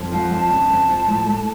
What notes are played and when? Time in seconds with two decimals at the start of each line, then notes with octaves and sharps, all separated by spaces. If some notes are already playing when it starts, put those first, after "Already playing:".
Already playing: F2
0.12 F3 F#5
0.31 F2 A5
0.50 C#3
0.69 F2
0.89 F3
1.07 A2
1.26 A3